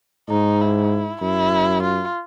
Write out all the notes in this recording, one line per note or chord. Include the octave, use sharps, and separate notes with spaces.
G#2 D#4
E4
F#2 E4
F4